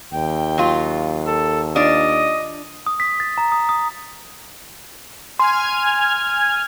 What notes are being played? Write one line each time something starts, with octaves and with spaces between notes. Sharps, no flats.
D#2 G5
F#3 F4
A4
D4 F4 D5 D#5
D#6
B6
A6
A#5
D#6
D#6
G#5 C6 F6 G#6